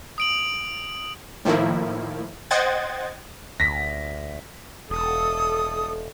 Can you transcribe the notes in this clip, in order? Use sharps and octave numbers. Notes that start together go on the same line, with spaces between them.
D#6 D7 F#7
A2 D#3 F3 A#3 E4
C5 D#5 F#5 G5 G#6 A6
D2 A#6 B6
E1 A4 D#6